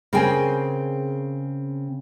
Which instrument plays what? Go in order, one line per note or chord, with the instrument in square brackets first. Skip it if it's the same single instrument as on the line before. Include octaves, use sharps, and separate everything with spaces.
[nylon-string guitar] C#3 C4 G#4 A#4 G5 G#5